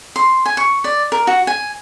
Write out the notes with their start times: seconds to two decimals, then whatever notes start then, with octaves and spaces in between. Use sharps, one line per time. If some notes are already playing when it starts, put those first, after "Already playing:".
0.16 C6
0.46 G#5
0.57 C#6
0.84 D5
1.12 A#4
1.27 F#4
1.47 G#5